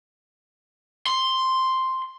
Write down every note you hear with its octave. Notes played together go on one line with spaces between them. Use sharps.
C6